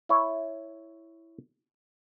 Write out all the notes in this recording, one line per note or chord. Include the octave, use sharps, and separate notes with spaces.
E4 C#5